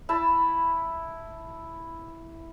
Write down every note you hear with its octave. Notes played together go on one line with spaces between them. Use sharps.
E4 A5 B5